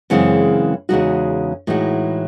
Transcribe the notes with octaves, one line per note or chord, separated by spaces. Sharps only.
F#2 C#3 E3 G#3 C4
E2 C#3 G#3 D#4 F#4
A2 E3 G#3 D#4 F#4